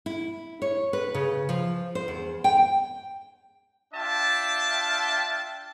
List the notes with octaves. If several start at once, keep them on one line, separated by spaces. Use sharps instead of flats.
E4
C#5
B4
C#3
F3
C5
E2
G5
D4 F4 E5 G5 A5